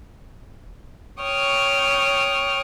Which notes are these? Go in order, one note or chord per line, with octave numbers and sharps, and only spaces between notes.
C#5 G5 C#6 D#6 F6